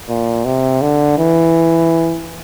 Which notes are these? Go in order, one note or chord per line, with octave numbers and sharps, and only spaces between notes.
A#2
C3
D3
E3